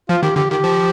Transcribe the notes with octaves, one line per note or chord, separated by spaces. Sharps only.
F3 F4
D#3 G4
D3 G4
D#3 G4
F3